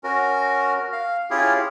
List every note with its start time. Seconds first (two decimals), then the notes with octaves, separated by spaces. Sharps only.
0.04 C#4 F#4 A#4
0.93 F5
1.31 C#4 E4 F4 G4 G#4